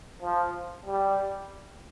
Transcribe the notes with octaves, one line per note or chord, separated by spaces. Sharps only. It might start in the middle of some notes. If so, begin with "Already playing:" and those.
F3
G3